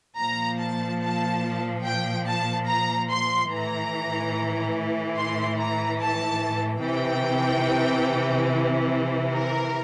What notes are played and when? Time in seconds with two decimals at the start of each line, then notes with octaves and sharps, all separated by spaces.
0.17 A#2 F3 A#5
0.59 A5
1.01 A5
1.84 G5
2.26 A5
2.67 A#5
3.09 C6
3.50 A2 E3 A#5
5.16 C6
5.57 A#5
6.00 A5
6.82 C3 E3 G5
9.32 A#4